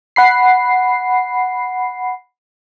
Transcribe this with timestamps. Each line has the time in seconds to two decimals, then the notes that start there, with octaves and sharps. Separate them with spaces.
0.16 F#5 B5 C7